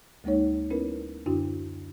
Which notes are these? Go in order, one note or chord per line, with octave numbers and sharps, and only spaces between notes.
D2 G#3 A#3 D#4 C#5
B3 C#4 E4 A#4 B4
F#2 D3 D4 E4 F#4